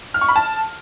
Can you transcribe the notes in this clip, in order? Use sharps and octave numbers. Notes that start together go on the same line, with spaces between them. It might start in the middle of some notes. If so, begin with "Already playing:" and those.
F6
C#6
B5
A5